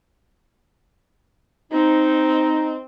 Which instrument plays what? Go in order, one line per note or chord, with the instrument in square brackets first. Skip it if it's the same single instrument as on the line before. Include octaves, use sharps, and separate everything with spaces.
[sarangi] C4 [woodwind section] D#4